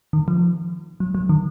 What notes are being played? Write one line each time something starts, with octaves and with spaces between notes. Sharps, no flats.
D#3
F3
F#3
F#3
D#3